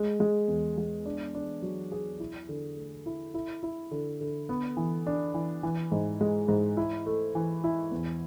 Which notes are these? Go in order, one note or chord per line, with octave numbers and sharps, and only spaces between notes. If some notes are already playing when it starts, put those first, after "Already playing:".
Already playing: G#3
G#3
E2
G#3
D4
D4
F#3
G#4
E4
D3
A3
E4
E4
E4
D3
D3
B3
E3
D4
E3
E3
G#2
G#3
G#2
E4
A3
E3
E4
E2